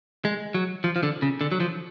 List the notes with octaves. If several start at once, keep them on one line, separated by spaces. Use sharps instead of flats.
G#3
F#3
F3
F3
D3
C#3
D3
F#3
F3